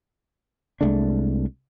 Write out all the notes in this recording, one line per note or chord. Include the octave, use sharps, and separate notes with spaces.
C2 G#3 A3 D4